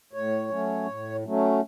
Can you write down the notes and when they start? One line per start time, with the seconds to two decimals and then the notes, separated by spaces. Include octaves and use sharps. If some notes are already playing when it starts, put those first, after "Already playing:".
0.13 A2 C#5
0.50 F#3 A3 C#4
0.87 A2
1.24 F#3 A3 C#4